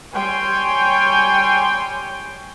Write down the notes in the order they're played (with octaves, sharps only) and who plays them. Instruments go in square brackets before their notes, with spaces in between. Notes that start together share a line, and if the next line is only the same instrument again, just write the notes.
[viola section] G3 C#5 G5 G#5 C6